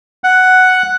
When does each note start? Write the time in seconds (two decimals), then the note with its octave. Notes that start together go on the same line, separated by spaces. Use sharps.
0.24 F#5